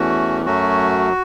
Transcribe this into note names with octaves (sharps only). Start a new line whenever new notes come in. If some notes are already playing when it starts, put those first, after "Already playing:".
Already playing: E2 E3 A3 C#4 F#4
F#2 F#3 A3 C#4 F#4